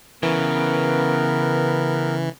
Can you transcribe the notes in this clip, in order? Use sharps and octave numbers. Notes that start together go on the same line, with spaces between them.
C#3 E3 B3 A#4